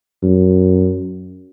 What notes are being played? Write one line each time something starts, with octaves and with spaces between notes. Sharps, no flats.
F#2